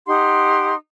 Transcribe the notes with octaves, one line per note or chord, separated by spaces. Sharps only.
D#4 G4 F#5 C6